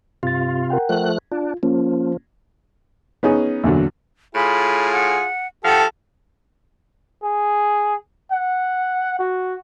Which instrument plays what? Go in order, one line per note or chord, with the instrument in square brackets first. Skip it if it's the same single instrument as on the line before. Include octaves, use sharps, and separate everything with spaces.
[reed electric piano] G2 A6 [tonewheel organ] C3 F4
[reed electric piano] A#4 F#5 G5
[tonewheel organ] F3 A3 F#6
[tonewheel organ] D4 [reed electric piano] F4
[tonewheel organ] F3 [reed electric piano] A#3 C#4 F4
[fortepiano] B3 C#4 D#4 G#4
E2 A#2 D3 F#3
[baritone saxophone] A2 [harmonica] F4 G#4 [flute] B5
[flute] F#5
[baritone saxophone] F3 [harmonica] G4 A4 [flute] F#5
[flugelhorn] G#4
F#5
F#4